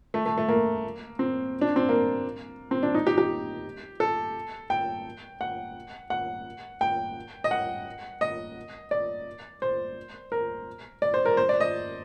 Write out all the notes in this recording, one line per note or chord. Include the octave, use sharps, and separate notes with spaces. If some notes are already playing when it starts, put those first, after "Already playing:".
A3
A3
A3
A#3
C4
D4
C4
A#3
C4
D4
D#4
G4
G4
A4
G5
F#5
F#5
G5
D#5
F#5
D#5
D5
C5
A#4
D5
C5
A#4
C5
D5
D#5